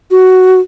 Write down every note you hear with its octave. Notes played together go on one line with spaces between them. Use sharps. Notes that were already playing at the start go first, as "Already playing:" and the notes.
F#4